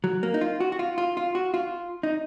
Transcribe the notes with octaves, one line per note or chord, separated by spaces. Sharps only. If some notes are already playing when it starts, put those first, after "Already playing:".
F#3
A#3
D#4
F4
F#4
F#4
F4
F4
F4
F#4
F4
D#4